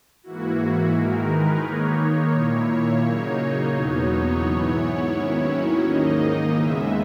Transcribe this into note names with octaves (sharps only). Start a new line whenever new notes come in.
G#2 E3 A#3 E4 F#4
D#3 G#3 D#4 A#4
B4
D#3 A#3 D#4 C#5
A#2 A#3 E4
C#3 F#3 A#3 D#4
E2 B2 F#3 B3 D#4 C#5
G#2 E3 B3 E4
D#2 D#3 F#3 C#4 E4
G#2 D#3 A#3 D#4 D#5
D#2 C#3 G#3 B3 E5